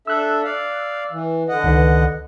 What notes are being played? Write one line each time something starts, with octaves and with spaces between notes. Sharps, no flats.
D4 A4 E5 E6 F#6
D5 F5
E3
D3 D#5 F#5
C#2 D#3 B4